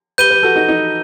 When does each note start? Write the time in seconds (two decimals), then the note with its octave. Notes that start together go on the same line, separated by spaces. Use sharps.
0.18 G4 B4 G6 D#7 G7
0.31 G4 B4
0.43 F#4 A4
0.56 D#4 F#4
0.68 D#4